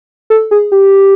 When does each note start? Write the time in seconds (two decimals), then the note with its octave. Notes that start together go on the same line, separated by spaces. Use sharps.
0.30 A4
0.51 G#4
0.72 G4